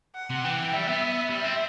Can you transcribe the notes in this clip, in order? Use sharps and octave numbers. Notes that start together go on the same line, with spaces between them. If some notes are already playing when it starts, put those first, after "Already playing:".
F#5
C3
E3 G5
G3 E5
B3
G3 E5
C4